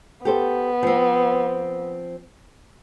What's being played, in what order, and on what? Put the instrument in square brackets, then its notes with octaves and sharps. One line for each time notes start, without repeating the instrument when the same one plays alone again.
[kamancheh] B3 [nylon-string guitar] G4 A4 C5
[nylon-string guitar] F3 C4